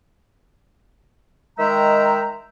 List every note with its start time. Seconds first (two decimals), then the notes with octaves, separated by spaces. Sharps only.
1.58 D#3 G#3 E5 G5 A#5